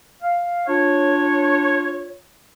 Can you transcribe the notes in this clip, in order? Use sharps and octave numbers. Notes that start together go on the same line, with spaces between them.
F5
D4 F4 C#5